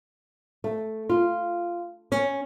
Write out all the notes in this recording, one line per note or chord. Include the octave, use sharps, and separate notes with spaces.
A3
F4
C#4